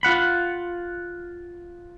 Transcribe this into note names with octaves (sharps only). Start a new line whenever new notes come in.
F4 F#5 B5